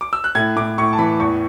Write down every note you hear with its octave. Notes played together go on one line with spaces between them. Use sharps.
D6
E6
F#6
A2 G#6
A2 D6
A2 C#6
A5
E3 B5
E2 C#6